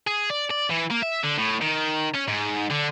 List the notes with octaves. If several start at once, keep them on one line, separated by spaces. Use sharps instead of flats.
G#4
D5
D5
E3
A#3
E5
D3
A2
D#3
C#4
G#2
D3